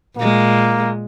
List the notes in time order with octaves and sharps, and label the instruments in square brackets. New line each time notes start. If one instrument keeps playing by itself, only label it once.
[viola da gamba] A#2 G#3 [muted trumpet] A#3